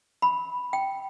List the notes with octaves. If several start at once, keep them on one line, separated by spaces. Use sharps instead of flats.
B5
G5